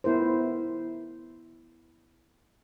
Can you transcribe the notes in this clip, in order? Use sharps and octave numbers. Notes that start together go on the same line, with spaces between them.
B3 E4 A#4 C5